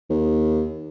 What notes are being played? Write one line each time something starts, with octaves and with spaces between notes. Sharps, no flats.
D#2